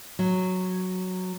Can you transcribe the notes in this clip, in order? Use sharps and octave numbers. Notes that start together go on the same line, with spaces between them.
F#3